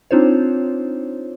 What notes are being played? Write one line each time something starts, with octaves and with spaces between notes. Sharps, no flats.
C4 D4 D#4 F4 C5 C#5